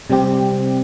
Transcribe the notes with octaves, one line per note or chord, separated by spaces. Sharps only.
C3 G3 C4 G4